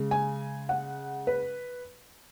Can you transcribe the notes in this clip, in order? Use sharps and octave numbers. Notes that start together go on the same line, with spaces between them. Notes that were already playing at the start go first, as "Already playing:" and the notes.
Already playing: C#3 G#3
G#5
F#5
B4